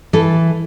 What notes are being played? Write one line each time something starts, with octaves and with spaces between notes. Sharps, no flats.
E3 A4